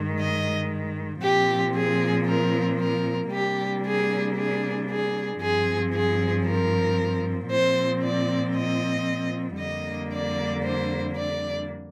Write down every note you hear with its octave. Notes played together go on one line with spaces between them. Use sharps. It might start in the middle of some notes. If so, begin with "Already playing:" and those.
Already playing: G2 D#3 G#3
D#5
A#2 F3 C4 G4
G#4
A#4
A#4
C3 G3 A#3 D4 G4
G#4
G#4
G#4
G2 F3 C4 G#4
G#4
A#4
A#2 F3 C4 C5
D5
D#5
F2 D3 G3 A#3 D4 D#5
D5
C5
D5